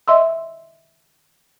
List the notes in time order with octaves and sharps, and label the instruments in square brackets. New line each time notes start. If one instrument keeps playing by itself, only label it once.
[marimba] D#5 E5 C6 E6